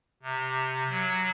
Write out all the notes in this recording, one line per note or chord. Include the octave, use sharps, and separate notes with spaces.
C3
F#3